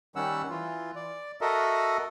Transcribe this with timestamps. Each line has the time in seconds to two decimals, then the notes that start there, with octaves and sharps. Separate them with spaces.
0.16 D#3 G3 C#4 F#5 E6
0.50 E3 F4
0.96 D5
1.41 F#4 A4 A#4 D#5 E5